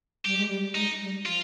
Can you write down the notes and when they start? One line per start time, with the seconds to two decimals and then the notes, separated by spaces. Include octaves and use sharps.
0.25 G3 G4
0.37 G#3
0.49 G3
0.75 G#3 D#4
1.01 G3
1.26 F3 F4